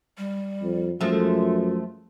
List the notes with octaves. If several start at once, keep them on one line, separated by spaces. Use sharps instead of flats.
G3
F2
F#2 F3 G#3 A3 F4